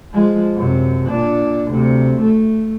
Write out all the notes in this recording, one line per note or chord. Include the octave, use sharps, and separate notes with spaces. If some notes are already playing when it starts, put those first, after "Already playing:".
F3 G#3
F#2 C3
A#2 D4
D2 C3
A3